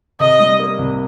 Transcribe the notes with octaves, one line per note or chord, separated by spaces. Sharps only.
C3 D#5
G3
A#3
C2